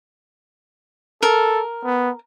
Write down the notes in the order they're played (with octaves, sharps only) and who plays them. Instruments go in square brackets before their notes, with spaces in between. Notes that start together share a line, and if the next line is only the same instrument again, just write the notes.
[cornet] A4 [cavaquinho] A#4
[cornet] B3